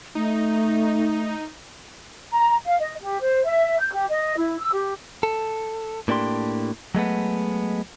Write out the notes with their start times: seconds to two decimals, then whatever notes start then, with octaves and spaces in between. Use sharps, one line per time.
0.15 A3 D#4
2.32 A#5
2.64 F5
2.78 D#5
3.01 G4
3.21 C5
3.44 E5
3.79 G6
3.92 G4
4.08 D#5
4.37 E4
4.59 E6
4.71 G4
5.23 A4
6.08 A2 A#3 D4 G4 C6
6.95 F#3 G#3 A3 B3